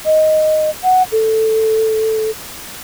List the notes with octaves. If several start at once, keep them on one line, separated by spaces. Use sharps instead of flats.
D#5
F#5
A4